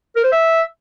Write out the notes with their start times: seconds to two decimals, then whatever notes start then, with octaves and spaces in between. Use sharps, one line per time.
0.16 A#4
0.24 C5
0.32 E5